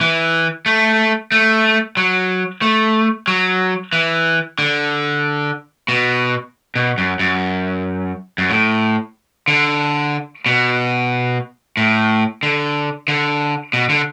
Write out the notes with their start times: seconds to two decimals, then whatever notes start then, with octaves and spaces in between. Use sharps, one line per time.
0.01 E3
0.66 A3
1.32 A3
1.97 F#3
2.62 A3
3.27 F#3
3.93 E3
4.58 D3
5.88 B2
6.75 B2
6.98 F#2
7.20 F#2
8.38 F#2
8.50 A2
9.48 D3
10.46 B2
11.77 A2
12.43 D3
13.08 D3
13.73 B2
13.89 D3